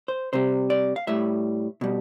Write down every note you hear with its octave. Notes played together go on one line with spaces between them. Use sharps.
C5
C3 G3 C5
D5
F5
A2 G3 E5
B2 G3